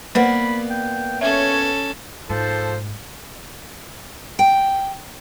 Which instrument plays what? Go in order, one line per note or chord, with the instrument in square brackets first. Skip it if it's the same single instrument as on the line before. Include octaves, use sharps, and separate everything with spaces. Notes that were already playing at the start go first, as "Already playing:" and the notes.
[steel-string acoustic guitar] A#3 B3 D5 [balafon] B4 C5 F#5 [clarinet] B5
[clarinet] G5
[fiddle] C#4 A4 [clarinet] C#5 [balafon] E5
[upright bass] G#2 [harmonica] F3 A4 C5
[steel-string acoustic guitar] G5